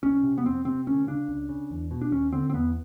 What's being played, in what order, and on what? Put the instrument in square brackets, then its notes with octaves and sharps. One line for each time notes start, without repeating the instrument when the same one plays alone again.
[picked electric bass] C2 C#4
C3
B3
F2 C4
C3 C4
D2 C#4
C#3 D4
C#2
C#3
E2
B2
D4
D#2 C#4
D3 C4
C4
E2 B3